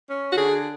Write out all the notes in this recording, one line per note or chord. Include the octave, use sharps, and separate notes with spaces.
C#4
F#4
D3 G#4